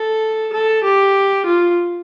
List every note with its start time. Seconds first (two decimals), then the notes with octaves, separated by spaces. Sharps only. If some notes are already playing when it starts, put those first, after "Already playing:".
Already playing: A4
0.53 A4
0.84 G4
1.46 F4